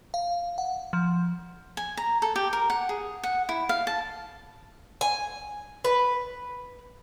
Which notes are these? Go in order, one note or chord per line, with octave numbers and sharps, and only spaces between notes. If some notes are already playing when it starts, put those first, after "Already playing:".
F5
F#5
F3
G#5
A#5
A4
G4
A#4
F#5
G#4
F#5
E4
F5
A5
G#5
B4